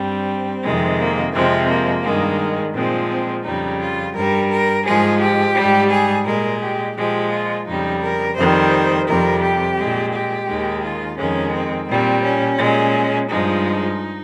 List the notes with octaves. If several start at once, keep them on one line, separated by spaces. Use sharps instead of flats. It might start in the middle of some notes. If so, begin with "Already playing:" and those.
Already playing: G2 G3 C4
F2 C3 D#3 G#3
A#3
F2 C3 F3 G#3 C4
A#3
G2 D#3 G#3
A#2 F3 G#3 C4
C4
F2 C#3 G3 D#4
F4
G2 G3 A#4
A#4
G#2 F3 G#3 G#4
G4
G#2 G3
G#4
A#2 G#3 A#4
G4
A#2 F3 G#3 G4
F4
F2 C#3 G3 D#4
A#4
F2 D#3 G3 C5
F2 C3 G3 A#4
G4
A#2 G#3
G4
D#2 D#3 G#3
F4
F2 D#3 G#3 C#4
C4
A#2 G3 C4
C#4
A#2 G#3
G2 F3 G#3 D#4